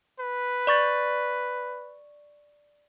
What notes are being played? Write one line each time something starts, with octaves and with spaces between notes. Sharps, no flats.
B4
D5 C#6 A6